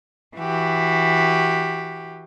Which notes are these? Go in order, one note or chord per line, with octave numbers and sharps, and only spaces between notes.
E3 F#4 G4